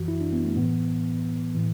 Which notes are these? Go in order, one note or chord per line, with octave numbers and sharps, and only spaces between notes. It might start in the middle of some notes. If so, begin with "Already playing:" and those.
Already playing: F#2 E3 F#4
E4
D4
B3
A3
A2 E3 B3
A2 E3